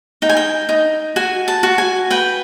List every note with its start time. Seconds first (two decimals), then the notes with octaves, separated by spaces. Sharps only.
0.22 D#4 G5
0.29 G#5
0.37 G5
0.69 D#4
1.16 F#4 G#5
1.48 A5
1.63 F#4
1.78 G#5
2.10 B4 G5